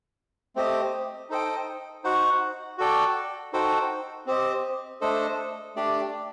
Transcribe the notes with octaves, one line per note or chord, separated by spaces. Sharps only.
A3 C4 G4 C5 D#5
D#4 A4 C5 D#5 G5
D#4 F#4 C5 F#5
F#4 A4 D5 G5
D#4 F#4 A4 C5 G5
C4 G4 C5 D#5
A3 D4 A4 C5 D#5
A3 D4 G4 D5